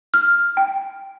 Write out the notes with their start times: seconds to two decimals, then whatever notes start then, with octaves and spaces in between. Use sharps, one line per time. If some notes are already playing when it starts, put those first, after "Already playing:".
0.14 F6
0.57 G5